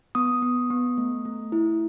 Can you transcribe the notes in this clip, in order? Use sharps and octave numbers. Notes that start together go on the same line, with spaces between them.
B3 D#6
B3
B3
A3
A3
E4